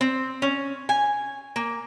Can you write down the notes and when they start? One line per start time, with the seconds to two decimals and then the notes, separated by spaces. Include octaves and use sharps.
0.01 C4
0.42 C#4
0.89 G#5
1.56 A#3